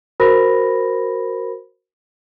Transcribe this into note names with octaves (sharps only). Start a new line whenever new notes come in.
F#4 A#4 C5 B5 A#6